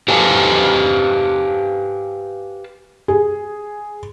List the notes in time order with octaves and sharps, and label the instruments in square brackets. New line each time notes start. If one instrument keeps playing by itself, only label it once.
[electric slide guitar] G4 B4 C5 F5 G#5 A5
[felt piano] G#4